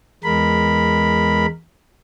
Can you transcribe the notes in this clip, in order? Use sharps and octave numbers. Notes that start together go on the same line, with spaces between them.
E2 G#3 A#4 B5